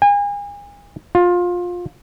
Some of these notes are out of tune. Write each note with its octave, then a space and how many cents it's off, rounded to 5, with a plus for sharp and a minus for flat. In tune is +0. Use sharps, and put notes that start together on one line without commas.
G#5 -35
F4 +20